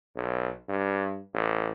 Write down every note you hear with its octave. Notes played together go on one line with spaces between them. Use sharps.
B1
G2
A1